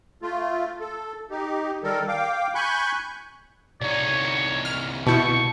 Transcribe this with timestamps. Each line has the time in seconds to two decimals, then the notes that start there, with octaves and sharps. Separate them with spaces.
0.22 A3 F4
0.80 A4
1.31 D#4 G4
1.84 D#3 G3 A4 A#4
2.08 F5 G5 D6
2.55 G#5 B5 C#6 F#6 G6
3.82 C2 D#4 C#5 D5
4.65 F6
5.07 B2 E4 A5 C#6 G6 C#7